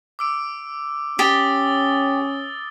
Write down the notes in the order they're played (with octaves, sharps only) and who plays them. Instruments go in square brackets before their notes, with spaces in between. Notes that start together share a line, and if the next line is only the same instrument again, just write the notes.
[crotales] D6 E6 D7
[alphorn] C#4 [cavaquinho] G4 [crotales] D#6 A6 G7